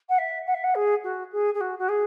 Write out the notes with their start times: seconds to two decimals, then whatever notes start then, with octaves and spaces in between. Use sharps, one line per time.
0.09 F#5
0.18 E5
0.47 F#5
0.54 E5
0.64 F#5
0.75 G#4
1.04 F#4
1.32 G#4
1.54 G#4
1.61 F#4
1.79 F#4
1.89 G#4